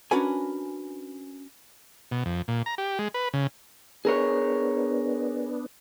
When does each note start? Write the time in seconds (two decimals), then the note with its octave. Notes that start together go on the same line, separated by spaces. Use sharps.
0.11 C#4 D4 F#4 A#4 B4 G#5
2.11 B2
2.26 F2
2.48 A#2
2.66 A#5
2.78 G4
2.99 G#3
3.14 B4
3.33 C#3
4.05 B3 D4 G#4 A#4 C#5